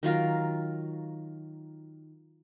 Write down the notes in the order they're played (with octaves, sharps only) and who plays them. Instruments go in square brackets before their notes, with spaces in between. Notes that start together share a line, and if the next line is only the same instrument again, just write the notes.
[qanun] D#3 F#3 F4 A#4